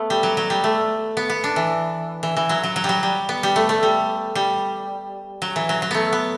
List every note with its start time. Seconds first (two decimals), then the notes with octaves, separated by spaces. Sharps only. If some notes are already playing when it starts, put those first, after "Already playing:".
Already playing: A3 B3
0.10 G3
0.23 F#3
0.37 F#3
0.50 G3
0.64 A3
1.17 B3
1.30 B3
1.44 D4
1.56 E3
2.23 E3
2.37 E3
2.49 F#3
2.64 F#3
2.76 F#3
2.84 G3
2.89 F#3
3.03 G3
3.29 B3
3.43 G3
3.56 A3
3.69 A3
3.83 G3
4.35 G3
5.42 F#3
5.56 E3
5.69 F#3
5.82 F#3
5.91 A3 B3
6.13 B3